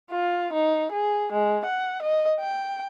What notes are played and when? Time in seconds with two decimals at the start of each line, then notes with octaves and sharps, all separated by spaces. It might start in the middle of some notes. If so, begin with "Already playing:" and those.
0.11 F4
0.53 D#4
0.92 G#4
1.32 G#3
1.65 F#5
2.02 D#5
2.40 G5